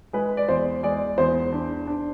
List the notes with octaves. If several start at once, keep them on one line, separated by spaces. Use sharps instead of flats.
G#3 B4
D5
E2 C5
G#3 D5
E2 C5
D4
D4